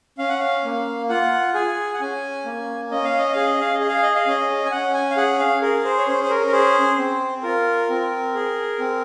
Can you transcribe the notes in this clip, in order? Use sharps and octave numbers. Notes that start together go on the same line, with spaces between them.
C#4 F5
F#5
F5
A#3
F4 F#5
G#4 G#5
F#5
C#4 G#5
A#3
C#4 D#5
F5
D#5
G#4 F5
D#5
F5
D#5
G#4
F5
D#5
F5
C#4 D#5
G#5
C#4 F#5
G#5
F5
G#4 F#5
F5
G#4 A#4
C5
C#5
C#4 C5
C5
A#4
A#4
G#4 C5
C4
F4 A#4
C4
G#4
C4